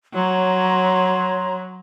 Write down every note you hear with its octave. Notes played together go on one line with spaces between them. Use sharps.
F#3 C#5 A#5 C6